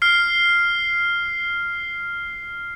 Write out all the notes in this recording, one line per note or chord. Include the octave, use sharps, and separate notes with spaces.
F6 C7